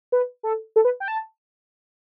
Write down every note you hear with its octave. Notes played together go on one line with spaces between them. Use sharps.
B4
A4
A4
B4
G5
A5